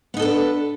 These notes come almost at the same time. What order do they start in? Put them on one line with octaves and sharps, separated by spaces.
B3 D#4 A4 D4 B4